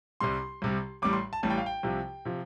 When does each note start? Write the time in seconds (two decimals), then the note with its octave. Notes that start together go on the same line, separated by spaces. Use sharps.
0.20 C2 C3 G3 C6
0.62 C2 C3 G3
1.02 A1 A2 G3 D6
1.13 C6
1.33 A5
1.43 A1 A2 G3 A5
1.50 G5
1.58 F5
1.66 G5
1.83 C2 C3 F3
2.25 C3 F3